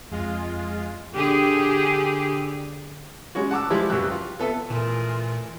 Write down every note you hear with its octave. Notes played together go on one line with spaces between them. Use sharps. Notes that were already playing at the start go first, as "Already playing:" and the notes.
F2 G#3 F4
D3 G4 G#4
G3 G#3 C#4 F#4
F#5 A5 D6 E6
F3 G3 G#3 E4
C#2 F#2 F#4 G4 E6 F#6
F4
B3 A4 E5
A#2 E3 A3 F4 G#4 A#4